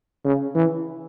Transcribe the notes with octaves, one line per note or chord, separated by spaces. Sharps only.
C#3
E3